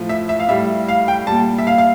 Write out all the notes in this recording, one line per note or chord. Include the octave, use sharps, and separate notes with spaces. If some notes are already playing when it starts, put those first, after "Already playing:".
Already playing: A2 F3
E5
E5
F5
A2 G3 E5
F5
G5
A#2 G3 A5
E5
F5
F5